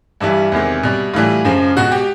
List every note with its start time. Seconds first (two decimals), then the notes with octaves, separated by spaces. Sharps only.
0.20 G2 E3 G3 E4
0.52 E2 C3 D#3 G#3
0.83 B2 G3
1.13 A2 E3 G3 F4
1.44 F#2 C#3 F3 G#3
1.76 B2 G#3 F#4
1.92 G4